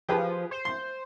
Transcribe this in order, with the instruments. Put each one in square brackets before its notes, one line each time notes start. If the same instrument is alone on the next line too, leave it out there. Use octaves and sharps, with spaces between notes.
[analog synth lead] F3 [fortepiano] G4 G#4 B4
[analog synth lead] C5
[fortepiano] C6